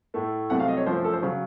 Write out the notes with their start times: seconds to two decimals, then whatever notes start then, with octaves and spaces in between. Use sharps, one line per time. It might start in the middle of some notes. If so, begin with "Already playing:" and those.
0.14 A2 A3
0.50 C2 C3 F#3 A3 F#5
0.60 F5
0.68 D#5
0.77 C#5
0.86 F#2 F3 A3 C5
1.04 A4
1.13 C5
1.23 C#3 F#3